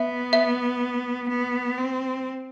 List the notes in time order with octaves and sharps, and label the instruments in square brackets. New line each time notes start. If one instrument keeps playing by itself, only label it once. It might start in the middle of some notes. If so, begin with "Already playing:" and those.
Already playing: [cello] B3 [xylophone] E5
[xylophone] E5
[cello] B3
C4